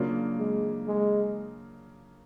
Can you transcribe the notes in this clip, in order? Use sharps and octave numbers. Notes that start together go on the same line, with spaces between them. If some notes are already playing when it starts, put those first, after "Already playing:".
Already playing: C#3 F#3 A#3 D4 F4
G#3
G#3